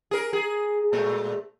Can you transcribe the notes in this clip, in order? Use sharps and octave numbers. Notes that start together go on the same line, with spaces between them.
G#4 A#4
G#4
A#2 G#3 A3